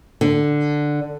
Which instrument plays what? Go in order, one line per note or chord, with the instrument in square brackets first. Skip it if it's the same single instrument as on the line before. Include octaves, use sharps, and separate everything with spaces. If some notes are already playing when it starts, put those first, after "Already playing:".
[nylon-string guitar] D3